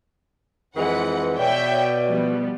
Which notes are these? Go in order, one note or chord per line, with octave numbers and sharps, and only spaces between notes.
F2 E3 G#3 B4 F#5
B2 C#5 D5 E5 G5
F3 G3 B3